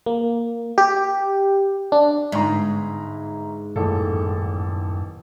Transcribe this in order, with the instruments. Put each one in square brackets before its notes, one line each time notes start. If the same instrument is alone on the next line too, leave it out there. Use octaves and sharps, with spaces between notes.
[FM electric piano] A#3
G4
D4
[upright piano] G1 A#5 [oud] G#2
[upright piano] D#1 A1 A4 [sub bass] F#2